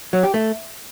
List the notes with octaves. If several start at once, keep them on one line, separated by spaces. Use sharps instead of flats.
F#3
G4
A3